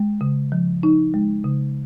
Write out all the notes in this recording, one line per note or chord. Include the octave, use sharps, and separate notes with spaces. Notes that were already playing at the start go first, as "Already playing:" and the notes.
Already playing: G#3
C#3
F3
D#4
G#3
C#3